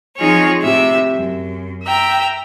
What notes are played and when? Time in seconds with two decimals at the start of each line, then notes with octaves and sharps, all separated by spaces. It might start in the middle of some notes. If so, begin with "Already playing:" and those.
0.17 F3 C4 D#4 F4 G#4 C#5
0.62 A2 C3 E5
1.16 F#2
1.85 E5 G5 A#5